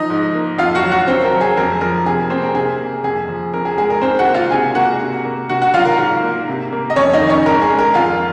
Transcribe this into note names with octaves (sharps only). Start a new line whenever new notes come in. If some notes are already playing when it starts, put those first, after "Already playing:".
Already playing: F3 D#4 D#5
G#2
A#3
F2 F4 F5
F#4 F#5
F#3
F#4 F#5
F#2 C4 C5
A#4
F#3
G#4
F2 A#4
F3 A#4
C3 G#4
A#3 C4 C5
A#4
C3 G#4
A#3
F2 G#4
F3
F2 A#4
G#4
G#3 G#4
A#4
G#2 C4 C5
F#4 F#5
A#3
F4 F5
C3 G#4 G#5
A#3 F#4 F#5
C3
A#3
C3 F#4 F#5
F#4 F#5
F#3 F4 F5
A#4
G#2
A#3
C3
A#3
D#5
F2 C#4 C#5
D#4 D#5
D#3
C#4 C#5
G#2 A#4
G#4
G#3
A#4
F2 F4 F5